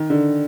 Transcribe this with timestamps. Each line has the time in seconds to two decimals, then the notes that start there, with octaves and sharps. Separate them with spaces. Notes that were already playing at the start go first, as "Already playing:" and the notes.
Already playing: D#3
0.10 D3